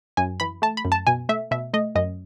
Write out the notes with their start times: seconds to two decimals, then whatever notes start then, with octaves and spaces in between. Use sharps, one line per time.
0.17 F#2 G#5
0.40 E3 B5
0.62 A3 A5
0.77 B5
0.85 F#2
0.92 A5
1.07 B2 G#5
1.29 A3 E5
1.51 B2 E5
1.74 A3 D#5
1.95 F#2 D#5